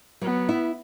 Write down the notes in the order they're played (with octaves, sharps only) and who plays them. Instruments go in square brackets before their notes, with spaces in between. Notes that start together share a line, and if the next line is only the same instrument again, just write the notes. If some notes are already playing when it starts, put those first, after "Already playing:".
[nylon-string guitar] F#3 [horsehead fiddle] B3
[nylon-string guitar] E4